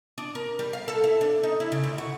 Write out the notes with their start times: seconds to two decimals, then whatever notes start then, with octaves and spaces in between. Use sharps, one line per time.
0.18 D4
0.35 A#4
0.59 G3
0.73 F5
0.88 A4
1.04 E4
1.21 D4
1.43 D#4
1.60 E4
1.72 C#3
1.84 D2
1.98 F#4